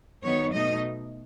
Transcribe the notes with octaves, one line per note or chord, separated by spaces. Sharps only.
D#3 F#3 B3 D#4 C#5
B2 A3 D#4 D#5